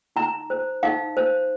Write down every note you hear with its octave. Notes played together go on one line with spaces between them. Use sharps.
D#4 A#5
C5
D#4 F5
C5